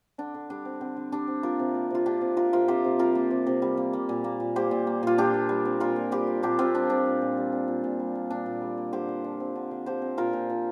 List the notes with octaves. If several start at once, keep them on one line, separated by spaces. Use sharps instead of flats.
D3 D4
D3
G3 D4
C4
D3 C4
D3
G3 D4
C4
A#3 F4 A#4
C3
A#3
C3 F4
A#3 D4 G4
C3
A#3 F4 A#4
C3 F4 A#4
C3 G4 C5
C3
G3 F4 A#4
A#3
C3
C3
G3
A#3
A#3
A#2
A#3
A#2
A#3 G4 C5
A#2
A#3
A#2 F4
A#2 D4 G4
A#2
G3
C4
A#2 F4 A#4
A#2
G3 G4 C5
C4
A#2 D4 G4
A#2 C4 F4
G3 D4
C4 D4
A#2
A#2
G3
C4
A#2
A#2
G3
A#3
A#2 D4
A#2
G3
A#3
D3 G4 C5
D3
F3
C4
D3
D3
F3 G4 C5
C4
A#2 F4 A#4
A#2
F3